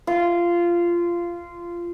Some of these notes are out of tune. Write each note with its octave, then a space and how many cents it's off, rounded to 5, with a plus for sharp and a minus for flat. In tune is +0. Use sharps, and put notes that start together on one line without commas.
F4 -15